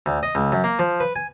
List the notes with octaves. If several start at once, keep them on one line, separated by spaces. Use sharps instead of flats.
D2
D#5
C#2
F#2
A#3
F3
B4
G#5